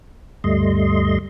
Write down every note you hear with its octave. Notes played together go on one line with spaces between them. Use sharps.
D2 G2 G3 A3 D#5 C6